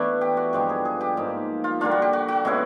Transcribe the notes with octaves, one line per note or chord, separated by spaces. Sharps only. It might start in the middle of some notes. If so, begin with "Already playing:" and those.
Already playing: E3 A3 B3 D4
G4
F#4
G2 D3 F3 G#3 G4
G#4
G#4
G4
G#2 F3 A#3 D#4
F4
D3 G3 A#3 D4 F4
F#4
G4
F#4
F#4
B2 G#3 C#4 E4